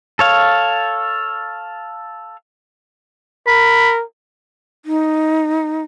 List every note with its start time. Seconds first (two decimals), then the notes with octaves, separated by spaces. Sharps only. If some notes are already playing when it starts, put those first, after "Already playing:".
0.19 A4 C#5 F5
3.47 A#4 B5
4.85 D#4